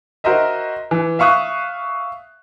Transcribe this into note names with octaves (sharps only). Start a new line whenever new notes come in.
F#4 A#4 C5 D#5 E5
E3
E5 F5 C#6 D#6 F#6